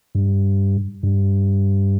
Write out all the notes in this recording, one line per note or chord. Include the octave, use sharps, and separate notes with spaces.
G2
G2